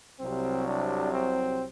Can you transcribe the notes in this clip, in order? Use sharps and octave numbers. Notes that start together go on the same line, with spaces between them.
C2 C3 F#3 C4
D4
C4